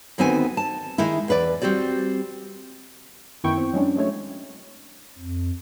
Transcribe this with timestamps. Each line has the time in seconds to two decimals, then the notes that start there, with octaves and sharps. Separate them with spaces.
0.18 D2 D#3 B3 C4 F#4 G#5
0.57 A5
0.98 D#3 G#3 D#4 E4
1.28 E2 B4 D5
1.62 G3 C4 F#4 G4 D5
3.44 F#2 D#3 B3 E4 G5 C#6
3.58 C4
3.73 F#3 G#3 C#4 D4
3.96 F#3 G#3 A3 C#5
5.18 F2